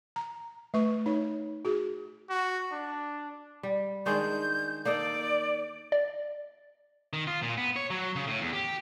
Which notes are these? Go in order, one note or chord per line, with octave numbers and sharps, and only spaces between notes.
A#5
A3 B4 C#6
D#4 C#5
F#4 G#4
F#4
D4
G3
D#3 G#3 D4 G6
A#3 D#4 A4 D5
D5
D#3
F4
A#2
B3
C#5
F#3
C#3
A2
E2
G4